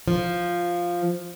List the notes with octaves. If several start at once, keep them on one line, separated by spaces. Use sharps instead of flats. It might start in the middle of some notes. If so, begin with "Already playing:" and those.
F3